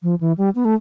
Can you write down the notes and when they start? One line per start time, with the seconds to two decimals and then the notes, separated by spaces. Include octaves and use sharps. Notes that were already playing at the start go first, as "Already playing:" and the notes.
0.03 F3
0.21 E3
0.38 G3
0.55 B3
0.65 A3